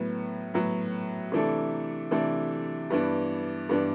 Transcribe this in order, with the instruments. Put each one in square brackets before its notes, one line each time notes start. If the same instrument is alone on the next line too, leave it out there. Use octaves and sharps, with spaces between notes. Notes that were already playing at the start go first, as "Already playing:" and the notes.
Already playing: [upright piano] A2 F#3 B3
A2 F#3 B3
C3 E3 A3 D4 A4
C3 E3 A3 D4 A4
G2 E3 B3 D4
G2 E3 B3 D4